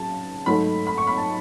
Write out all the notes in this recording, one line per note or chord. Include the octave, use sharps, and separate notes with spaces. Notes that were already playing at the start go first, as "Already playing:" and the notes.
Already playing: C#3 F#3 A5
G#2 F#3 A3 B5
B5
C#6
B5
A5